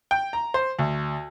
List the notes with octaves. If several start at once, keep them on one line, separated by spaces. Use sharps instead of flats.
G5
A#5
C5
D2